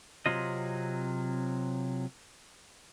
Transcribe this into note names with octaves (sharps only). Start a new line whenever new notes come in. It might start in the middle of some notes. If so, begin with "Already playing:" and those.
C3 F#3 C4 F4 D#5